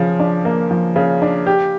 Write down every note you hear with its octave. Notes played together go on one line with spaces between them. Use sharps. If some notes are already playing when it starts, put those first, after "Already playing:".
Already playing: C#3 F3
D4
A#3
F3
C#3
D4
G4